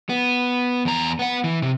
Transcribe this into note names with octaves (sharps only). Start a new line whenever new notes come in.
B3
E2 A#5
B3 F#5
E3
C3